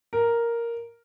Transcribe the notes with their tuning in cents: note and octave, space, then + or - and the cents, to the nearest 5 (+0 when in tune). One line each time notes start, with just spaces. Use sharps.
A#4 +0